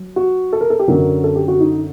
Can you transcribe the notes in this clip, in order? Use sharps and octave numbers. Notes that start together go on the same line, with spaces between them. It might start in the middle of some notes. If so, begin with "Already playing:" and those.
Already playing: F#3
F#4
A4
A#4
A4
G4
F#2 D3 F#3 A#4
A4
G4
F#4
D#4